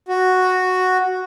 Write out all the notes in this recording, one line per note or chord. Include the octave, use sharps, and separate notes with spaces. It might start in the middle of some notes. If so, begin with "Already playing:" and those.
F#4